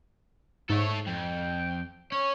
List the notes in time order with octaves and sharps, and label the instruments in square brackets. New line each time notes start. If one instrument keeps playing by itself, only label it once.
[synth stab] G#2 [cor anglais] A3 [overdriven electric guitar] A4 C#5
[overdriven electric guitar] F2 [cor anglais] G5
[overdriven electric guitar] C#4 [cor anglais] C#5